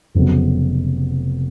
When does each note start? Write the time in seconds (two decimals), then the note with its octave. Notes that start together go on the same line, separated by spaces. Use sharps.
0.14 F1 F2 C#3 F#3 B3